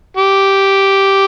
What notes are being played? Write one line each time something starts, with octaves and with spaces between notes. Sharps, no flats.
G4